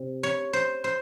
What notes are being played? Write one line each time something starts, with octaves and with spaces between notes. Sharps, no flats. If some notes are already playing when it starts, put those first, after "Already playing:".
Already playing: C3
C#5
C5
C5